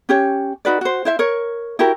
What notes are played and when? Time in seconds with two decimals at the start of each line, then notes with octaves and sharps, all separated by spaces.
0.09 C#4 G4 C#5
0.65 D#4 F#4 B4 D5
0.81 F#4 C5
1.05 E4 C5 E5
1.19 A#4 C#5
1.79 E4 F#4 G4 A#4